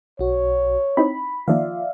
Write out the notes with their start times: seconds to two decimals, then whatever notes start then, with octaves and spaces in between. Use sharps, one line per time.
0.19 B1 F#4 C#5
0.97 C4 D#4 E4 B5
1.48 D#3 F3 A#3 F4 D5 E5 F5